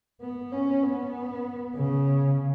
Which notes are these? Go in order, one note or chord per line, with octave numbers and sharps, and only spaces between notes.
B3
C#4
B3
C#3